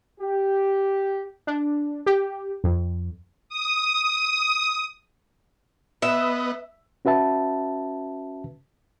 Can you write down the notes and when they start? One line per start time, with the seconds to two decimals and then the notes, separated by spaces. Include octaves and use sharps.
0.20 G4
1.47 D4
2.06 G4
2.64 F2
3.49 D#6
6.02 B3 B4 D#5 E5
7.05 C#4 F#4 B4 E5 A5